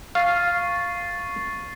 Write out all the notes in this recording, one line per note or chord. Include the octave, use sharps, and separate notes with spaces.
F5 C#6 A6 C7